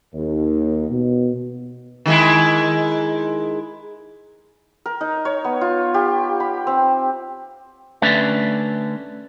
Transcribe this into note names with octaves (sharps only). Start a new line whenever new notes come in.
D#2
B2
D#3 G#3 E4
A#4
D#4
C#5
B3
F4
G4
B5
C4
D3 A3 C#4 B4 D5 E5